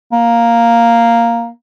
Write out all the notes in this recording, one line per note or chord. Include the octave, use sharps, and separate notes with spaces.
A#3